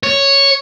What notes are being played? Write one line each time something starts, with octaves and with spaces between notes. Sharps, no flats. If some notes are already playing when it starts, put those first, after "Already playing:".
C#5